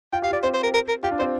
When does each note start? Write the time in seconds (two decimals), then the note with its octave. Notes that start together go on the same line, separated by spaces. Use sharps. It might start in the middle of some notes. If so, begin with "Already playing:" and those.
0.13 F4 G5
0.22 G4 F5
0.31 F4 D5
0.42 C4 C5
0.54 C5
0.63 A#4
0.74 A#4
0.88 A#4
1.03 F4 G4
1.11 D4
1.19 C4 C5